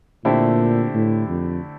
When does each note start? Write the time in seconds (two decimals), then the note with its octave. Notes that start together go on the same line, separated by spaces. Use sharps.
0.25 A#2 D3 A3 C4 E4 G4
0.95 A2
1.28 F2